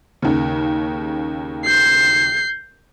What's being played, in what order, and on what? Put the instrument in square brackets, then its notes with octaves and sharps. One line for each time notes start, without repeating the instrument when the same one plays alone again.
[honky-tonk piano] D#2 C#3
[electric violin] G6 C7